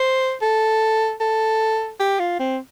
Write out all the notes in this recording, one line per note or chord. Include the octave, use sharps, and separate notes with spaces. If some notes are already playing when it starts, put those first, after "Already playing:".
Already playing: C5
A4
A4
G4
F4
C4